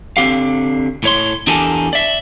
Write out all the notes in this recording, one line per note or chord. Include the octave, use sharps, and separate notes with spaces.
D3 C4 G4 F5
A2 C#5 C6
E2 D4 G4 A4 A#4 G#5
D5 E5